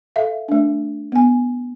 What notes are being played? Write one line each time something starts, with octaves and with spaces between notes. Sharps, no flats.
A4 E5 F5
A3 D4
B3 G#5